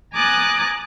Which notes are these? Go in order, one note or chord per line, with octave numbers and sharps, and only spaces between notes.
G#5 A#5 D6 D#6 F#6 A6